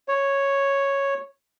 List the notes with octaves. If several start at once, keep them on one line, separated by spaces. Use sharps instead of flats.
C#5